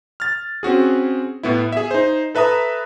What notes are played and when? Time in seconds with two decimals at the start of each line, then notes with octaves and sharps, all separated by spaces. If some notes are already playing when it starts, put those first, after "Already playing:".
0.20 F6 A6
0.63 C4 C#4 F#4 G#4
1.43 A2 B3 E4
1.72 G#4 E5
1.91 D#4 C5
2.35 A4 B4 E5 A#5 D#6